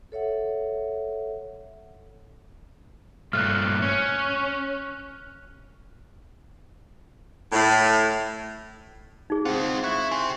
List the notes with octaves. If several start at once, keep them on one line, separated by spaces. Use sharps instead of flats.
A4 C#5 E5 F#5
G2 A#2 A3 F6 F#6
C#4
A2
D#4 G#4
G#3 C4 F4 F#5
E4 C#6 F#6
G4 C5 G#5